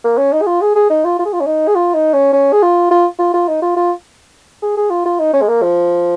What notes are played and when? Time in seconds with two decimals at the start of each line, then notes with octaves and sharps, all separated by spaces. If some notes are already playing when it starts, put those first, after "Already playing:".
0.04 A#3
0.18 C#4
0.33 D#4
0.42 G#4
0.47 F4
0.61 G#4
0.76 G#4
0.90 D#4
1.05 F4
1.19 F4
1.25 G#4
1.33 F4
1.41 C#4
1.47 D#4
1.68 G#4
1.75 F4
1.94 D#4
2.14 C#4
2.33 C#4
2.53 G#4
2.62 F4
2.91 F4
3.19 F4
3.34 F4
3.48 D#4
3.62 F4
3.77 F4
4.62 G#4
4.77 G#4
4.90 F4
5.06 F4
5.20 D#4
5.33 C#4
5.42 G#3
5.48 A#3
5.62 F3